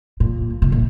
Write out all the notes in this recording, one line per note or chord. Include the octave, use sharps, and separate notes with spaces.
A#2
C3
A#2